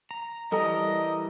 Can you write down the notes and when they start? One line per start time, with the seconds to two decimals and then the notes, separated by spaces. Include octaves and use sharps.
0.11 A#5
0.52 E3 G3 A4 A#4 D#5 A#5